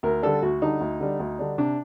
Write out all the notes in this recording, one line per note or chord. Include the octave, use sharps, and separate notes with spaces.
D2 A#4
D3 G3 D4 A4
D2 F#4
D3 G3 D4 D#4
D2
D3 G3 D4
D2
D3 G3 D4
C3 D4